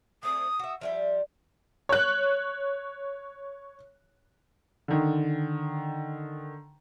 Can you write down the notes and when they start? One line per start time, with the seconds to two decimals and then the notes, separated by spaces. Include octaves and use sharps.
0.23 A3 C4 D#6
0.59 F#4 E5
0.81 F3 G3 G4 E5
1.89 C#5 F#6
4.88 D3 D#3